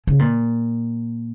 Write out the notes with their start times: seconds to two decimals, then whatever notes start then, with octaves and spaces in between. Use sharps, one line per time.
0.07 C#3
0.19 A#2